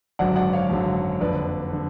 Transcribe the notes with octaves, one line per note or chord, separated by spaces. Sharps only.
G#1 F#2 D3 F#3 D5 F#5
D5 F#5
C#5 F5
G#1 F#2 D3 F#3
F#1 F2 D3 B4 D5
D3